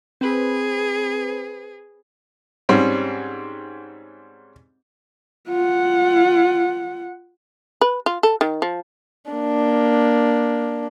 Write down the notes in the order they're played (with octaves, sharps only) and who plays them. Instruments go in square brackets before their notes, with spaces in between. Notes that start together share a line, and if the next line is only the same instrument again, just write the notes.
[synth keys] C4 B4 [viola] G#4
[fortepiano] G#2 G3 C4 C#4
[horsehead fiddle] F4 F#5
[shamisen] B4
F4
A4
D#3
F3
[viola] A#3 D4